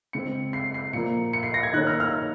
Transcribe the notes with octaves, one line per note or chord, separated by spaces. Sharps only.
C#3 G#3 C4 C#7
C7
C7
A#2 F3 A#3 C#7
C#7
C7
A#6
G#6
D#3 A#3 C#4 F#6
F6
F6